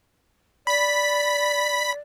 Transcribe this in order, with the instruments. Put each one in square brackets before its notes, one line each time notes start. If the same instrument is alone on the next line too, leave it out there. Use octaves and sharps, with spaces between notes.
[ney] D5 [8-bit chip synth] B5 B6